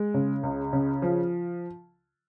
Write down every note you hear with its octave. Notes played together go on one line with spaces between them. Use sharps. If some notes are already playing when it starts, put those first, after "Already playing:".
Already playing: G#3
C#3
C#2
C#3
F3